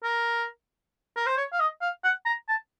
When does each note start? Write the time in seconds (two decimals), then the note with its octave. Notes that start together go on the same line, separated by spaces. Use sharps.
0.03 A#4
1.16 A#4
1.26 C5
1.37 C#5
1.53 F5
1.60 D#5
1.82 F5
2.04 F#5
2.26 A#5
2.48 A5